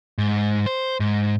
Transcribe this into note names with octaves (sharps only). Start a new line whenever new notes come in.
G#2
C5
G#2